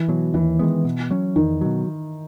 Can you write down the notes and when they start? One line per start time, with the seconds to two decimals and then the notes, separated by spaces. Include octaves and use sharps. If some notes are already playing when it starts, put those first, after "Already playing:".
Already playing: E3
0.09 B2 F#3
0.34 D#2 E3
0.59 D#3 G#3 B3
0.85 B2
1.10 F#3 C#4
1.36 E2 D#3
1.61 B2 F#3